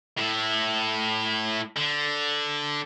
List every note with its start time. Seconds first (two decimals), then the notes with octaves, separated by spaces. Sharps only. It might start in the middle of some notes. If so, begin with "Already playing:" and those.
0.18 A2 E4
1.77 D3